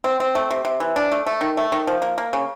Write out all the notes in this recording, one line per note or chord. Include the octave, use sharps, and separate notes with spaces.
C4
C4
A3
C3
C3
E3
D4
A3
A3
D#3
A3
D#3
F3
A#3
A#3
C#3